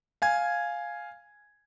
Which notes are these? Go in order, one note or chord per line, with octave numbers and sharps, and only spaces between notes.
F5 G#5 G#6